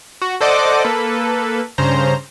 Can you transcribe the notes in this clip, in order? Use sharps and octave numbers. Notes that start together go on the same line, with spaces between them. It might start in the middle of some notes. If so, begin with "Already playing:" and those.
F#4
A4 C5 D5 D#5 F#5 D6
A#3 A4 B4
G2 C#3 C5 A#5